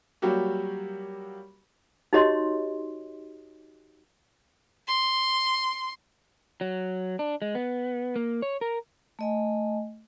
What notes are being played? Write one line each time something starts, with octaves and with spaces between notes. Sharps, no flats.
F#3 G3 A#3 F#4 G4
D#4 F#4 G4 C#5 D#5 C6
C6
F#3
D4
G#3
B3
A#3
C#5
A#4
A3 D#5 G#5